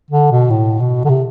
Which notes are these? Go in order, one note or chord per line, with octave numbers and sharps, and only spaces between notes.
D3
B2
A2
B2
D3
C3